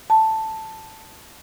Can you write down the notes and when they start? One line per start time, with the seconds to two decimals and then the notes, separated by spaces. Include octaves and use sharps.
0.10 A5